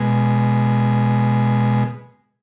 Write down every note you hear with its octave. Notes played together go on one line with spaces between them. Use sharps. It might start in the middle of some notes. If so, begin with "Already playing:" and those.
Already playing: B2 G#3